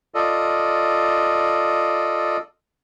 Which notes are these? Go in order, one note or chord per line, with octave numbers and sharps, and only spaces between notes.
F4 A4 D5 D#5